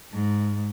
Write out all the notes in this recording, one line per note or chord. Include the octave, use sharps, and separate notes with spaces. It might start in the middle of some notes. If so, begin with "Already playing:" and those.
G#2